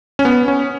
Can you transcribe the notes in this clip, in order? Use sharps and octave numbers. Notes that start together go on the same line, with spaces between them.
C#4
B3
C#4